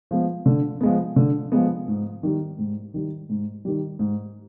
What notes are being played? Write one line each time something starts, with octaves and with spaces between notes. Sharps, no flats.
F3 G#3 B3
D3
F3 G#3 B3
D3
F3 G#3 B3
G#2
D#3 G3
G#2
D#3 G3
G#2
D#3 G3
G#2